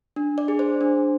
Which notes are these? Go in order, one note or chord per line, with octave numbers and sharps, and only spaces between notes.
D4
D5
G#4
C5
D4